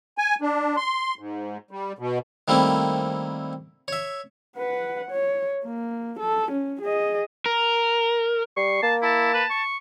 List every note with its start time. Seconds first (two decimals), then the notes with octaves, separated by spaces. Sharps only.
0.18 G#5
0.41 D4
0.77 C6
1.19 G#2
1.71 G3
1.99 B2
2.48 D#3 G3 A3 A#3 C4 E4
3.88 C#5 E5
4.57 B4 F#5
5.11 C#5
5.64 A#3
6.19 A4
6.51 C#4
6.82 G#4 D#5
7.46 A#4
8.57 G3 C#6 C7
8.83 A#3 A5
9.03 E4 A5
9.34 B4
9.50 C#6